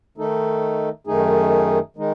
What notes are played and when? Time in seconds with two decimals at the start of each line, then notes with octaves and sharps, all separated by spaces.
0.18 D#3 A3 D#4 A4
1.07 F#2 D#3 A3 D#4 G#4
1.97 D#3 G#3 D#4